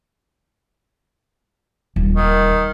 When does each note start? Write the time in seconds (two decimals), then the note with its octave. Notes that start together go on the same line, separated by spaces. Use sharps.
1.96 D#1
2.16 D#3